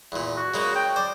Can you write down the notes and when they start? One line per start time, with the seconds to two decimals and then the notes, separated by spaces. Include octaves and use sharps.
0.12 E2 A#2
0.36 F#4
0.54 C#3 G#3 A#3
0.75 G5
0.96 C5 D5